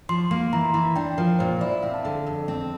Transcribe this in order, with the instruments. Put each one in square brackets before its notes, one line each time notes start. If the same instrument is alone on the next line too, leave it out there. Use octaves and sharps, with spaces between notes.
[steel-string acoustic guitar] F3 [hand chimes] C6
[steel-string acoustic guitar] A#3 [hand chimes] C6
[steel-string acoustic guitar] E3 [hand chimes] A#5
[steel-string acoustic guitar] E3
[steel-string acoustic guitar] D4 [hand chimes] G5
[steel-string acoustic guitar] F3 [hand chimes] A#4
[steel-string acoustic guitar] A#2 [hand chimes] C5
[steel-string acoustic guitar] E4 [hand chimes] D5
[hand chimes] E5
[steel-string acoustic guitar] C4 [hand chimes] F5
[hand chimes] A5
[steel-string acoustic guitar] D3
F2
C4